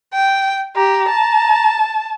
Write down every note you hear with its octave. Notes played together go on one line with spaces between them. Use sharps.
G5
G4 A#5
A5